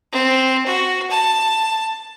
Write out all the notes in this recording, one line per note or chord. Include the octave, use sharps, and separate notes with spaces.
C4
F#4
A5